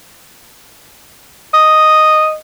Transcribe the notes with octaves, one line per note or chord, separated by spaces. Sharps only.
D#5